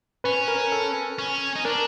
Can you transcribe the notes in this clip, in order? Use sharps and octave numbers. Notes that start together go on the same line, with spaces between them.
C#4 B4
A#4
A4
C#4
D#4
D4 A#4